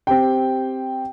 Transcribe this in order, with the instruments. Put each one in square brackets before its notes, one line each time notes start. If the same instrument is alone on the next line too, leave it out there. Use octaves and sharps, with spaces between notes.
[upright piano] C4 G4 G5